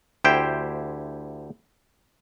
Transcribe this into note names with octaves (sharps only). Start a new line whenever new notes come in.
D2 E4 G4 C5 G5